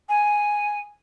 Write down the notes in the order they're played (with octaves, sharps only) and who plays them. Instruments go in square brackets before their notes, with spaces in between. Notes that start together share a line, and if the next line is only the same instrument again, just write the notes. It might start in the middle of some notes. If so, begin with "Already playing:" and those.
[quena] G#5